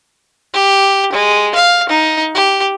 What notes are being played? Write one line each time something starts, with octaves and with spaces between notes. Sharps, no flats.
G4
G#3
F5
D#4
G4